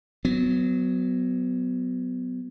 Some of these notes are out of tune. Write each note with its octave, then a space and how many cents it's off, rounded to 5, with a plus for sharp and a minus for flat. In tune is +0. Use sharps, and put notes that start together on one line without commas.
F#3 +0 B3 +20